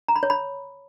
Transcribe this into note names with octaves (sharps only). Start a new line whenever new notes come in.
A#5
B5
C#5
B5